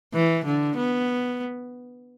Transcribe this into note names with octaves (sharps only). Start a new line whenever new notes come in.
E3
D3
B3